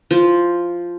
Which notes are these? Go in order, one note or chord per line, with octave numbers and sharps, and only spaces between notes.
F3